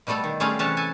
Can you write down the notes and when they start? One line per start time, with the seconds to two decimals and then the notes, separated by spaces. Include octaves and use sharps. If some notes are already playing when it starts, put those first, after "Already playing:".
0.07 B2 G3 A3 B3 A4
0.24 D#3
0.40 G3 A3 C#4 F4 G#4 F5
0.59 C3 E3 C#4 B4 C#5 A5
0.77 A4 G#5 A5